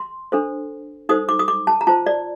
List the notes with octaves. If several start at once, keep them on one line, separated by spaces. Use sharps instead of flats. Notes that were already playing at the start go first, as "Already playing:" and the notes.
Already playing: C6
D4 A4 C5
D#4 A4 C5 D#6
D6
D#6
D6
A5
A#5
F4 C5 A5
D5